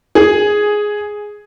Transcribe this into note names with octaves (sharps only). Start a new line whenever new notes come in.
G#4